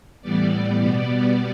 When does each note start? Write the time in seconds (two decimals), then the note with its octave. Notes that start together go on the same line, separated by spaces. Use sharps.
0.22 A2 E3 G3 B3 D5
0.81 B2 G3 B3